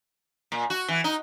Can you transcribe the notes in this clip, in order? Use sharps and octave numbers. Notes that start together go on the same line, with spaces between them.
A#2
F#4
E3
D#4